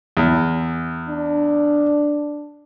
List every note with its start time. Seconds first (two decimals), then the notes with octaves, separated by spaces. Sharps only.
0.17 E2
1.09 D4